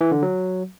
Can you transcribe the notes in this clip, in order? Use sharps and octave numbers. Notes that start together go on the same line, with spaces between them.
E3
D3
F#3